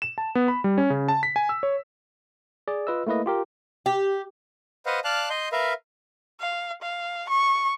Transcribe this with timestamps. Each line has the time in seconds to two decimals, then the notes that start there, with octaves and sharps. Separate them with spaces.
0.02 E7
0.18 A5
0.35 B3
0.48 B5
0.64 G3
0.78 C#4
0.90 C#3
1.08 A5
1.23 B6
1.36 G#5
1.49 E6
1.63 C#5
2.68 G#4 D5
2.87 F4 B4 D#5 E6
3.07 A3 A#3 E4 B4 D#5
3.26 F4 G4 A#4
3.86 G4
4.86 B4 C5 D#5 F5 F#5
5.04 D5 F5 A5 F6 F#6
5.30 D#5 C6 G6
5.52 A#4 B4 E5 F5
6.40 F5
6.82 F5
7.29 C#6